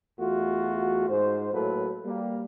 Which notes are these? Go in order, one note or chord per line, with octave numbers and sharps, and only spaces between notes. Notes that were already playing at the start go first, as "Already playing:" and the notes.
E2 A3 F4 F#4
G#2 C5
A2 F#3 A#3 A4 B4
G3 A#3